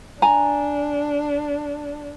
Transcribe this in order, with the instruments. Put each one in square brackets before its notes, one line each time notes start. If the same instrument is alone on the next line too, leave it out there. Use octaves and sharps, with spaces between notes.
[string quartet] D4 [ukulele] G#5 A#5